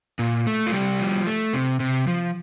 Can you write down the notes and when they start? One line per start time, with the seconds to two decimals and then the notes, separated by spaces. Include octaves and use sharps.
0.19 A#2
0.47 A3
0.66 F4
0.72 C3 G3 G4
1.00 F3
1.26 A3
1.54 C3
1.80 C3
2.07 F3